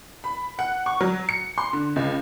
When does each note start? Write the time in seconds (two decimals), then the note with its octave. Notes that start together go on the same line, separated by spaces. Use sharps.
0.24 B5
0.59 F#5
0.86 C#6
1.01 F#3
1.29 C#7
1.58 C6
1.73 D3
1.96 C#2